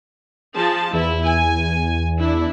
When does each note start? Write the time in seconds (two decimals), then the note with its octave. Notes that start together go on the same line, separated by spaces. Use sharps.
0.56 F3 G#4 A5
0.93 E2 E4
1.25 G#5
2.19 D4 E4